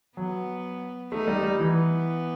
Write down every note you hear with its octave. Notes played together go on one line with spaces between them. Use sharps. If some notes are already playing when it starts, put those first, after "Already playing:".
F#3 B3
A3 D#4
G3
G3
E3 B3